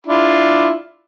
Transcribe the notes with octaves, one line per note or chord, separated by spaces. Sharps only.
D4 E4 F4